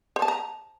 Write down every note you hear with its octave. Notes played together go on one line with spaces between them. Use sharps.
C5
A5
A#5